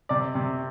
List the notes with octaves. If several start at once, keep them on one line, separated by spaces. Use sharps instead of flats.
C3 D5
C3